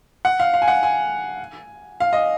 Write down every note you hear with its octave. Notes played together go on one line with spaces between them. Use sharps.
F#5
F5
F5
G#5
F#5
G#5
F5
D#5